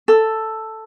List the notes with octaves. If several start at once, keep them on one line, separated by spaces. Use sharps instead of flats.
A4